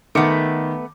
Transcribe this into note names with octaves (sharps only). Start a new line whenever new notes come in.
D#3 A3 B3 D6 C#7